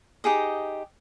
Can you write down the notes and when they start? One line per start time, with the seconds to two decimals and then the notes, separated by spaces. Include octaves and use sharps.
0.24 D#4 G4 G#4 D#5